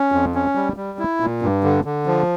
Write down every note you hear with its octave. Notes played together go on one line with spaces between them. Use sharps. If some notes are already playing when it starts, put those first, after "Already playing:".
Already playing: C#4
F2
C#4
G3
G3
E4
A#2
G2
D3
D3
F3